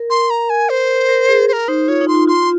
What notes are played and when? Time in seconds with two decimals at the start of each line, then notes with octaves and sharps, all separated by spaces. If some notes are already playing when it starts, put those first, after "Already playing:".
Already playing: A#4
0.10 A#4 C6
0.30 A#5
0.50 G#5
0.69 C5
1.09 A#4
1.29 G#4
1.48 C5
1.53 A#4
1.68 D#4 C5
1.88 F4 C#5
2.01 D#4
2.08 C6
2.14 F4
2.27 F4 C6
2.43 F4